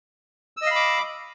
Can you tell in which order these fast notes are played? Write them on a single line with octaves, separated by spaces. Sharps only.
E6 D#5 F5 B5 D6